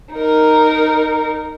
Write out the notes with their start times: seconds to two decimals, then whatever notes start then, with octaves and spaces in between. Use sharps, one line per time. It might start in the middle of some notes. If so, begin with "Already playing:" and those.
0.13 D#4 A#4